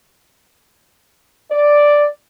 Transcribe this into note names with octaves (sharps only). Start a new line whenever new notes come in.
D5